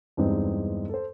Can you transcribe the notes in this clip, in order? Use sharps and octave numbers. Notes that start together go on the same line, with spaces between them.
E2 G2 G#3 C4 D#4
A4 C5